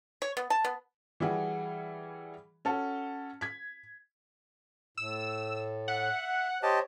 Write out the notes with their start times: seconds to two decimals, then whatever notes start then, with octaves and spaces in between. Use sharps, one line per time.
0.22 C#5
0.37 B3
0.50 A5
0.65 B3
1.20 E3 G3 E4 F#4 G#4
2.65 C#4 F#4 A4
3.41 G#6 B6
4.97 A2 E6
5.88 E5 F#5
6.63 G4 C5 C#5 D#5 A5